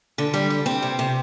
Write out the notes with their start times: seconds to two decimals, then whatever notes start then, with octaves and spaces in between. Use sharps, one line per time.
0.18 D3
0.34 G3
0.50 G3
0.66 C4
0.82 C3
0.99 C3